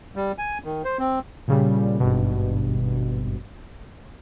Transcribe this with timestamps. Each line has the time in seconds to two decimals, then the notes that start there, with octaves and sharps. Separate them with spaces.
0.16 G3
0.38 G#5
0.64 D#3
0.85 C5
0.99 C4
1.48 A#2 C#3 G3
2.00 G#1 G2 B2